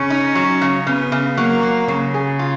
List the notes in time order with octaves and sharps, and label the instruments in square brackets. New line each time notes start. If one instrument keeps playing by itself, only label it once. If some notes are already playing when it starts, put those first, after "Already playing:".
Already playing: [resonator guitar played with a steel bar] C#3 [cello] C#4
[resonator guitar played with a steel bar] D#4
F#3
C#3
[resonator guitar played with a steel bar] C#3 [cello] B3
[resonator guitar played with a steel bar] C#3
[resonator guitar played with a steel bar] F#3 [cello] A#3
[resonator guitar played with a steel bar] F#3
[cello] C#3 [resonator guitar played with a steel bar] F#3
[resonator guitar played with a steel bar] G#4
F4